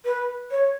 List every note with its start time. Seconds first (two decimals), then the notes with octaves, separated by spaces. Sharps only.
0.05 B4
0.51 C#5